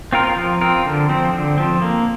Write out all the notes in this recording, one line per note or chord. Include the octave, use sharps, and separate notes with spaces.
C4 F4 A#4
F3
C4 F4 A#4
D3
F3 C4
D3
F3 C4
A#3